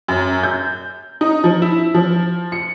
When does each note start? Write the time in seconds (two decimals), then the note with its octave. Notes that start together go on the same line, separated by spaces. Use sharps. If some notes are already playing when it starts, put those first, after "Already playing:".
0.08 F#2
0.43 G6
1.21 D#4
1.44 F3
1.62 E4
1.94 F3
2.52 C#7